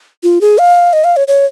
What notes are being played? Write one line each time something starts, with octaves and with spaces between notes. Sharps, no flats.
F4
G#4
F5
D#5
F5
C#5
C#5